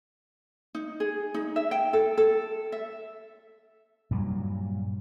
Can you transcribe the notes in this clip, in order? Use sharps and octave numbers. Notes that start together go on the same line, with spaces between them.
D#4
G#4
D#4
E5
G5
A4
A4
E5
G2 A#2 F#3